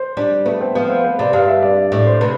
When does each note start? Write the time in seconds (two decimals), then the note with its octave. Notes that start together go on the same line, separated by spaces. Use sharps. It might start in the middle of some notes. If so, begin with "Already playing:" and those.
Already playing: C5
0.17 G3 D4
0.46 A3 B3
0.61 C4
0.75 F3 B3
0.90 C4
1.04 B4
1.19 C3 D5
1.33 G2 F5
1.48 E5
1.62 D5
1.92 A2 D5
2.07 C5
2.21 C3 B4